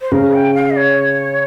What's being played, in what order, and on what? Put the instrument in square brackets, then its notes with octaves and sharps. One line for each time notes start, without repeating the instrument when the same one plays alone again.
[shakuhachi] C5
[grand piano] C#3 [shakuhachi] A#4
[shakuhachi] G5
F5
D#5
C#5